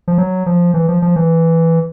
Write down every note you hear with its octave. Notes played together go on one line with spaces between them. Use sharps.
F3
F#3
F3
E3
F3
F3
E3